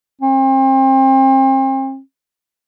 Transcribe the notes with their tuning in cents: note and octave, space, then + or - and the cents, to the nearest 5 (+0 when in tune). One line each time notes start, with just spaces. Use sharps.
C4 +35